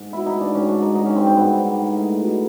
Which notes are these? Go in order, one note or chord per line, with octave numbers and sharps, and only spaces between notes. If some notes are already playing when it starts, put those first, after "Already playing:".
Already playing: G#2
B2 E4
D#4
B2
D4
G#2 C#4
D4
G#2
D#4
F#3 D#4
C#4
G2 C4
C4
G#2 B3
G#2
A2
A2
B2